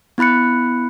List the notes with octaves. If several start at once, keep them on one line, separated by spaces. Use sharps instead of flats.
B3 E4 B5 F#6 C#7